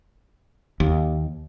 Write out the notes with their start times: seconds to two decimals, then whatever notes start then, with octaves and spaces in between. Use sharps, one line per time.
0.80 D#2